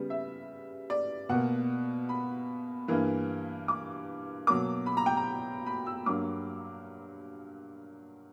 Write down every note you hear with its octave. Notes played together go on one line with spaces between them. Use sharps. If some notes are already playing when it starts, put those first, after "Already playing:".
Already playing: C#3 G3 B3
E5
D5
B2 A#3 F#5
B5
G2 E3 A#3
D6
B2 F#3 A#3 D6
B5
A#5
G5
A#5
B5
E6
G2 F#3 A#3 D6